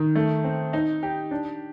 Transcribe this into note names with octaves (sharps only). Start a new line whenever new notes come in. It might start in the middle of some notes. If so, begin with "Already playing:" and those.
Already playing: D#3
A3
C4
D#4
G4
D4